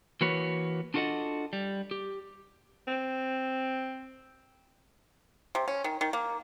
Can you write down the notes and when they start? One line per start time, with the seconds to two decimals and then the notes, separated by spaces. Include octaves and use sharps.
0.21 E3 A#3 F#4 B4 C#5
0.94 D4 F4 F#4 A4 D#5 F#5
1.53 G3
1.91 G4
2.87 C4
5.55 C3
5.68 C#4
5.84 D#3
6.01 D#3
6.13 A#3